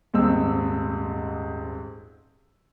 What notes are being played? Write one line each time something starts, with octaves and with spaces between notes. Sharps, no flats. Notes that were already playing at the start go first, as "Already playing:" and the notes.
D#1 G#2 C4 D#5 E6